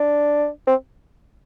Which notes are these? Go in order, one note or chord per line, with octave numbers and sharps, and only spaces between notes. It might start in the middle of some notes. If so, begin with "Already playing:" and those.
Already playing: D4
C4